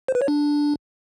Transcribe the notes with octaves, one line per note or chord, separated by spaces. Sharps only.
C5
B4
C#5
D4